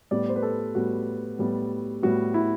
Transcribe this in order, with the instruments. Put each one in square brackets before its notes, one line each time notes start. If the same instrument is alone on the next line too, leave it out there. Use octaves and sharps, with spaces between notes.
[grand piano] A2 G3 B3 D5
C5
B4
A4
A2 G3 B3 F#4
A2 G3 B3
A2 G3 B3 F#4
E4